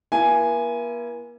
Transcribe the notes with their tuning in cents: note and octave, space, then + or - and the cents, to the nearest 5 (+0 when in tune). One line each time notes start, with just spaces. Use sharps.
A#3 +45 E4 +40 G#5 +0